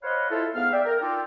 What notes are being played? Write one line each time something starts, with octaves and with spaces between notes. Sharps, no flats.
C5 C#5 D#5 F5 F#5 B5
E4 F4 A4
G#2 B3 F5 F6
D5 E5 G5
A#4
D4 D#4 F4 A4 D5 G5